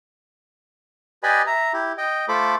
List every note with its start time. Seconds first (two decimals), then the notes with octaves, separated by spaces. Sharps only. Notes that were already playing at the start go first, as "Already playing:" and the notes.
1.23 G4 B4 D5 D#5 G#5 B5
1.47 E5 A#5
1.73 E4 G4
1.98 D#5 G5
2.28 A3 F4 A4 C5 B5 D6